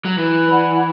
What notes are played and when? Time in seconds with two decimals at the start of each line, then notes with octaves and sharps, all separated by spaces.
0.05 F#3
0.18 E3 B4
0.48 D5 F#5 B5